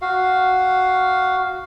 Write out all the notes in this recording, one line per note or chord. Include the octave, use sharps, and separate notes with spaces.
F#4 F5